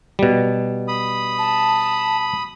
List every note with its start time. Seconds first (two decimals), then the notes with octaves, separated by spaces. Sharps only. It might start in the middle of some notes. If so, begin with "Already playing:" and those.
0.19 B2 G3
0.88 B5 D#6
1.39 A5